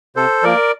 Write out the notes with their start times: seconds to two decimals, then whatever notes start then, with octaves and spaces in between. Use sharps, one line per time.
0.16 C3 A4 C5
0.43 F3 A#3 A#4 D5